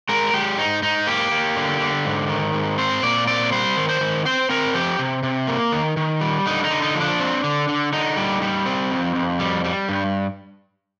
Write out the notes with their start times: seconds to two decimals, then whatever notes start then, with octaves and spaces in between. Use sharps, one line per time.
0.09 G#3 A#4
0.34 G#3 G4
0.58 G#2 D#4
0.82 G#2 D#4
1.07 A#3 G4
1.31 A#3
1.56 D3
1.80 D3
2.05 G#2
2.29 D#3
2.54 G#2
2.78 C4 C5
3.03 A#2 D5
3.27 C4 D5
3.52 G3 C5
3.77 D#3
3.89 C5
4.01 D#3
4.25 C4 C5
4.49 C4 A#4
4.74 F3 G4
4.99 C3
5.23 C3
5.47 A#3
5.72 D#3
5.97 D#3
6.21 G3
6.46 D3 D#4
6.64 D#4
6.70 D3
6.82 D#4
6.95 F3
7.01 D4
7.19 C4
7.44 D3
7.69 D3
7.93 D3 D#4
8.17 G3
8.42 G3
8.66 C4
8.91 F2
9.15 F2
9.40 G3
9.65 G3
9.89 G2